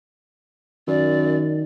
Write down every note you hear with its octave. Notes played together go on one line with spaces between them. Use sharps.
F#2 D#3 D5